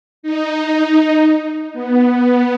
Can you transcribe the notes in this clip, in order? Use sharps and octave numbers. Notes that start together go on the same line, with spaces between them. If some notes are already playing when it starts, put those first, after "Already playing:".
D#4
B3